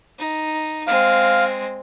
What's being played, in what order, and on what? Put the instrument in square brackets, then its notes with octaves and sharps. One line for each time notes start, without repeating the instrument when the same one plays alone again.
[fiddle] D#4
[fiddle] G#3 C4 [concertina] F5